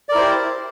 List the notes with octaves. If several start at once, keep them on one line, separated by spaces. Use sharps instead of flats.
E4 G4 A#4 C5 D5